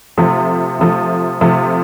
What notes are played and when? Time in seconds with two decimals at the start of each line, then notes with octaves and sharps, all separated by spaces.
0.17 C3 F3 A3
0.79 C3 F3 A3
1.41 C3 F3 A3